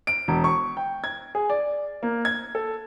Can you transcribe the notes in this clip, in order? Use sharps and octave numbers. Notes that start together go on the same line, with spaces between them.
D7
E1
C#6
G5
G#6
G#4
D5
A#3
G#6
A4